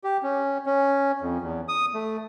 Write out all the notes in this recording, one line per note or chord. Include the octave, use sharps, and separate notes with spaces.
G4
C#4
C#4
F2
E2
D#6
A3